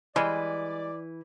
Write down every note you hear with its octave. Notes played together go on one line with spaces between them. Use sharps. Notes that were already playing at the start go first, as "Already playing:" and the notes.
E3 G3 G#3 D5